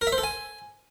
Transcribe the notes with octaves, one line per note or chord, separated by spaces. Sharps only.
A#4
E5
C5
A4
G#5